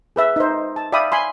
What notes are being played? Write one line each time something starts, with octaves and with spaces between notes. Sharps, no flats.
G#4 B4 E5
D#4 C5
A5
D5 E5 F5 G5 B5 D#6
G#5 B5 C6